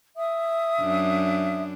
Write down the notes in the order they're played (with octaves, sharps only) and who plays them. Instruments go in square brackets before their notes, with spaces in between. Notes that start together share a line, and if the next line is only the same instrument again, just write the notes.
[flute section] E5 D#6
[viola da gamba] F#2 D4